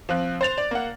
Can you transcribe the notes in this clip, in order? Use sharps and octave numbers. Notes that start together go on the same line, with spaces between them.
F3 C4 F#6
C5 A6 F7
D5
A#3 F#5